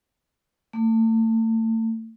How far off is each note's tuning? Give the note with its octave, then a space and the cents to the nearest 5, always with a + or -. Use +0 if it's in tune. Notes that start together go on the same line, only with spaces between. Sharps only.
A3 +35